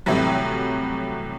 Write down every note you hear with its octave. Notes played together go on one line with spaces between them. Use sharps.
A2 C3 E3 F#3 G3